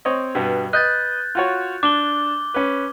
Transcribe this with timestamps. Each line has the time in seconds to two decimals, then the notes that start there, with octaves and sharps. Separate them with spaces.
0.05 C4 C#5 D#5
0.35 G2 B2 B3
0.73 B4 D#5 F#6 G6 A6
1.35 F4 F#4 C#5
1.83 D4 D6 G7
2.54 C#4 B4